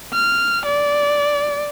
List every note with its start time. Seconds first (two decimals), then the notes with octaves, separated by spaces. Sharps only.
0.13 F6
0.66 D5